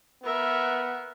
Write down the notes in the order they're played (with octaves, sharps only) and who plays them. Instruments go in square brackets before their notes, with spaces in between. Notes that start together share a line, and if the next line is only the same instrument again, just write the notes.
[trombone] B3 [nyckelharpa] A#4 E5